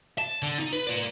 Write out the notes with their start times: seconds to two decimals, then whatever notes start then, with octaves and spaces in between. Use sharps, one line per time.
0.18 A5
0.43 D3
0.60 D#4
0.73 B4
0.87 A#4 D5